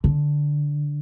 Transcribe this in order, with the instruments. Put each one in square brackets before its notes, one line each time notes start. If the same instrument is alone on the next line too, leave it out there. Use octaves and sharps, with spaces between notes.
[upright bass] D3